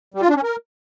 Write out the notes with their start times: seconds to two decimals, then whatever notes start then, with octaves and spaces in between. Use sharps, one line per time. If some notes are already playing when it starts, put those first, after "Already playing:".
0.14 G3
0.22 F4
0.29 D4
0.36 C#4
0.44 A#4